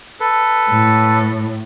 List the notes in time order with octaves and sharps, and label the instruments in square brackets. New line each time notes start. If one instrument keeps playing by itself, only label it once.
[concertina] A4 B4
[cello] A2